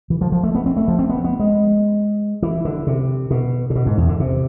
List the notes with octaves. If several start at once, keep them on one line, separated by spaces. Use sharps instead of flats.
E3
F3
F3
A3
B3
C4
A3
F3
C4
B3
B3
G#3
E3
D3
C3
B2
C3
B2
G#2
E2
D3
C3